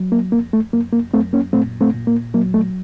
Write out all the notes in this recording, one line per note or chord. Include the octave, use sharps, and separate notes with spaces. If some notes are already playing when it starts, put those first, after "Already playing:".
Already playing: F#3
A#3
F2 A#3
A3
F#2 A#3
A#3
F#2 A3 C4
A#3 C#4
A#2 A3 C4
A3 C4
A#2
A#3
F#3 A#3
A3